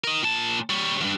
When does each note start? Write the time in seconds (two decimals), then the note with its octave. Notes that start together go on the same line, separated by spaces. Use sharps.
0.04 A#4 D#5
0.23 A#2 A5
0.70 G3 C#5
1.01 E2 G2